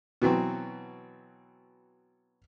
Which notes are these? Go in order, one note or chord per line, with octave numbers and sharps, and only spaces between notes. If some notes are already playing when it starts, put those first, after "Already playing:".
B2 E3 F#3 C4